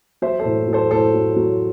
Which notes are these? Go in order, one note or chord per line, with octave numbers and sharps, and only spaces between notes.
F#3 C5 E5
A4 C5
A2
F#3
A4 C5
A2 A4 C5
F#3
F#3